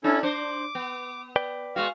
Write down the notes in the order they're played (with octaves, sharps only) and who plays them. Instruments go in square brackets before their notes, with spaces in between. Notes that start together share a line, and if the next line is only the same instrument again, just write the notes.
[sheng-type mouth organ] C#4 E4 A4 [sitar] D4
[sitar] D4 C5 [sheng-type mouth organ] D6
[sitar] B3
[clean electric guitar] B4 D5 G5
[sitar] G#3 B3 F#4 [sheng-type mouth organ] F5